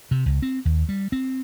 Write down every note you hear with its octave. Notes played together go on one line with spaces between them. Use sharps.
C3
C#2
C4
D#2
G3
C4